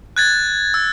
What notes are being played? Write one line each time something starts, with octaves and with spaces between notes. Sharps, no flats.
F#6 G#6 A6
E6